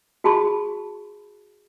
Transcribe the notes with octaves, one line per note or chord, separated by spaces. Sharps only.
F#4 G#4 A5 B5 C#6